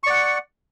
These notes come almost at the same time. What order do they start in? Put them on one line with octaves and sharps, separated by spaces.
C#6 D5 F#5